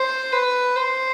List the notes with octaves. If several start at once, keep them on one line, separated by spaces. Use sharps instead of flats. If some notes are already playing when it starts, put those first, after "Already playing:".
Already playing: C5
B4
C5